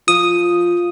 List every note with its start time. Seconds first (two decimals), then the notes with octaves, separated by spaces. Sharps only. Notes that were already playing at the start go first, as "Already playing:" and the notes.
0.08 F3 D#6